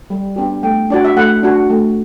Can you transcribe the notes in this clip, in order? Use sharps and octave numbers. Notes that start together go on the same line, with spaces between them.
G3
B3 D4 G4
A3 G5
D4 F#4 D5
E5
A3 F#5
D4 F#4
A3